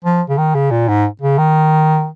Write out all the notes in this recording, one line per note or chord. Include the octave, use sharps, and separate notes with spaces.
F3
C#3
D#3
C#3
A#2
G#2
C#3
D#3